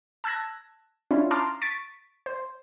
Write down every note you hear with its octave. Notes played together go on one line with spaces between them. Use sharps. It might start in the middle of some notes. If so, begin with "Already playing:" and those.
A5 E6 F#6 G#6 A#6
C#4 D4 E4 F4
A5 A#5 C6 D6 F6
C#6 A6 B6 D7
C5